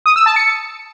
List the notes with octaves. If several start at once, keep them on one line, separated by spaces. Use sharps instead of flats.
D#6
E6
A5
C#7